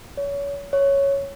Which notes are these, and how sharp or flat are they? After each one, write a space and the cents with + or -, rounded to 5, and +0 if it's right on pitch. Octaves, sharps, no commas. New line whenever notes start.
C#5 +30
C#5 +0